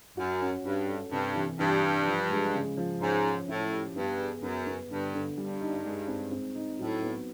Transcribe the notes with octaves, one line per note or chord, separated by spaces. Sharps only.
F#2 F#4
C#4
G2 F#4
A4
G2 C3
E3
G2 E3
G3
F3
G#3
C#3
F3
G#2 C#4
C#4
A2 E4
G4
G2 B3
G#4
F#2 B3
B3
G2 D3
D3
G2 G3
D#4
G#3
C4
C4
D#4
A2 F#3
B3